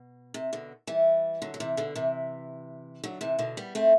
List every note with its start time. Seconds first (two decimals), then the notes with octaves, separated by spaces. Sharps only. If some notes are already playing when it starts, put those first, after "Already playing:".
Already playing: B2
0.34 C3
0.53 B2 D3
0.87 E3 G3
1.42 D3 F#3
1.54 F#3
1.60 C3 E3
1.77 B2 D3
1.95 C3 E3
3.04 D3 F#3
3.21 C3 E3
3.39 B2 D3
3.57 G3 B3
3.75 A3 C4